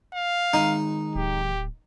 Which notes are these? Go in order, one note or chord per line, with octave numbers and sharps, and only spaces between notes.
F5
D#3 G#3 D#4 D#5
D1 G4